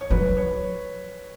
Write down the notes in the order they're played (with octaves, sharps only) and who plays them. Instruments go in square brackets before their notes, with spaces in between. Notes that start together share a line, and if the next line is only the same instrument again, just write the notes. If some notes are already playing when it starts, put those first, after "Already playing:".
[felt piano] C#5
[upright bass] F#3 [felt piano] B4
[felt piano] C#5